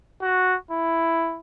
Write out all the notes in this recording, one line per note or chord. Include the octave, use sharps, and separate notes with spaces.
F#4
E4